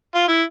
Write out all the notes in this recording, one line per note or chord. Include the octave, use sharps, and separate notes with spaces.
F4
E4